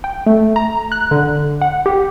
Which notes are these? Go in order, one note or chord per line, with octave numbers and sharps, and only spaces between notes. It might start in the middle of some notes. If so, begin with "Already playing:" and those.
G5
A3
A#5
F#6
D3
F#5
G4